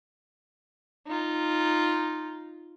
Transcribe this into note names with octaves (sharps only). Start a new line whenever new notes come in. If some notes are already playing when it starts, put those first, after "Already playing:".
D#4 F4